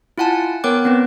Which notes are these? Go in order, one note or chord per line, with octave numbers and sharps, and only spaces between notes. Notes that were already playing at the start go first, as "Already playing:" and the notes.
E4 F4 F#5 G#5 A5
B3 A#4 C#5 G5 D6 F#6
B3 C4 B4